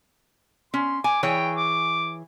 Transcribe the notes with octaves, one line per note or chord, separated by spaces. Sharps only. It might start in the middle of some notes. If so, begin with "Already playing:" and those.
C#4 C6
G#5 D6
E3 G#4 C#5 G5
D6